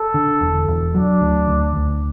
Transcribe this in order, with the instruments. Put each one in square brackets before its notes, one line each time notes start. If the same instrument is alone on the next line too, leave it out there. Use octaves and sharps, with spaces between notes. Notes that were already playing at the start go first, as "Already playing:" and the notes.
Already playing: [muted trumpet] A4
[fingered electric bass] D3
E1
E1
[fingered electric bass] F#3 [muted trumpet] D4
[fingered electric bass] D2
D2
D2